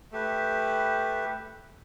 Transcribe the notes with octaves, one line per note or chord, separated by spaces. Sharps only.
A3 G4 B4